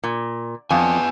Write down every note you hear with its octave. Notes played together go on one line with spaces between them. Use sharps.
A#2
F2 B3 B4 G#5